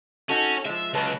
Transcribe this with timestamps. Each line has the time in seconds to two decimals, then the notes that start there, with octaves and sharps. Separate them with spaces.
0.29 C#4 D#4 F#4 A4
0.65 F3 G#3 E5
0.94 C#2 F#3 B4 A5